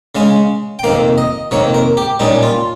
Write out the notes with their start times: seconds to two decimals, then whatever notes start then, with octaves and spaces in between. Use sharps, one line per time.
0.15 C#3 G#3 C#4 F5
0.79 G5
0.83 F2 C3 D#3 A#3 F5
1.18 D#5
1.51 F2 C3 D#3 A#3 C#5
1.74 A#4
1.97 G4
2.20 A#2 G3 C#4 D#4
2.43 F4